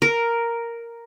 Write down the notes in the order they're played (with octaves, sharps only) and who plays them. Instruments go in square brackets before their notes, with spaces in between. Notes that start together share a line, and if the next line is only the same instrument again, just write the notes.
[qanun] A#4